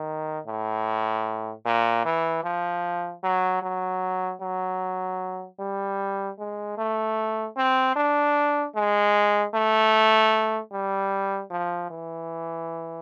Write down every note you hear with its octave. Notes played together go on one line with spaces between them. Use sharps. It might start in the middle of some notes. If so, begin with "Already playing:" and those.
Already playing: D#3
A2
A#2
E3
F3
F#3
F#3
F#3
G3
G#3
A3
C4
D4
G#3
A3
G3
F3
E3